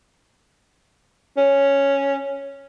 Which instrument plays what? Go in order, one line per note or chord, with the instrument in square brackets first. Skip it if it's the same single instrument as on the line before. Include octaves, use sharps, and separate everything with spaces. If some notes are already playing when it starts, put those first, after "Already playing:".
[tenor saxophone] C#4